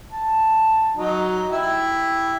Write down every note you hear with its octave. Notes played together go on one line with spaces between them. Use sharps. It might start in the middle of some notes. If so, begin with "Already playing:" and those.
A5
F#3 D#4
E4 G4 E5